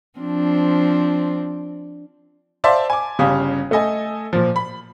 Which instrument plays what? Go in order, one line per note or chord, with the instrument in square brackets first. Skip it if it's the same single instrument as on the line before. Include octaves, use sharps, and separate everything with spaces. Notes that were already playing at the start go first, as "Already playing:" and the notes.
[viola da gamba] F3 C4 D4
[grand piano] C5 D5 E5 F5 A5 C6
G#5 D6
G1 C#3 C#4 G4 F5 D#6
A3 A4 D#5 G#5
A#2 F3
B5